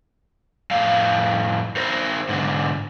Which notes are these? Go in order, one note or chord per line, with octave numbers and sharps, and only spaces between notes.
F2 A2 F5
D#4 A#4 C5
G#2 D3